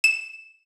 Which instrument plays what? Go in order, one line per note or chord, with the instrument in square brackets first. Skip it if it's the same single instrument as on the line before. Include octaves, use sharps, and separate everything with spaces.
[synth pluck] E7